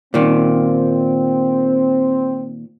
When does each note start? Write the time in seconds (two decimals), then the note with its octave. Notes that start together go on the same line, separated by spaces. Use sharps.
0.14 A#2 D#3 C4